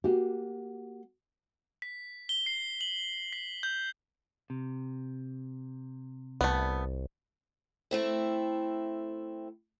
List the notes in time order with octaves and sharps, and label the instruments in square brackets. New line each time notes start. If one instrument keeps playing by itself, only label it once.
[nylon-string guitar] A#3 F#4 G4
[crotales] B6
G7
C7
F#7
B6
G6
[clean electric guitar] C3
[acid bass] C2 [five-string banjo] A3 B3
[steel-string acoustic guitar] A3 C4 E4